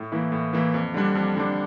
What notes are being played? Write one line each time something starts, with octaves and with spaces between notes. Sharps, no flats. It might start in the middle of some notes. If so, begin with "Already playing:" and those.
Already playing: A2
E3 A#3 E4
A2
E3 A#3 E4
F2
D3 G3 D4
F2
D3 G3 D4